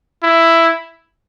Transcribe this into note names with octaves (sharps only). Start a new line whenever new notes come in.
E4